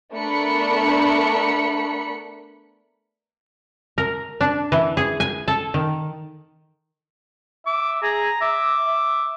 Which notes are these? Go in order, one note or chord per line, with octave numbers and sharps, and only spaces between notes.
A3 B3 D4 A#4 B5 C#7
A#4
D4
E3
G#4
G#5
A4
D#3
E5 D6
G#4 A#5
E5 D6
E5